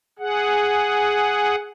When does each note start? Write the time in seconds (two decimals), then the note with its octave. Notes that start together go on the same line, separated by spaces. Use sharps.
0.19 G#4 F#5